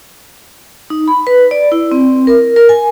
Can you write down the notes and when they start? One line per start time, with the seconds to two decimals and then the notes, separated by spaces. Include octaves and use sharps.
0.90 D#4
1.08 B5
1.27 B4
1.51 D5
1.72 E4
1.91 C4
2.27 A#4
2.56 A#4
2.69 G#5